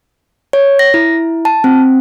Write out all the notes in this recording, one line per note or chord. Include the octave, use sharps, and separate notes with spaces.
C#5
A#6
E4
A5
C4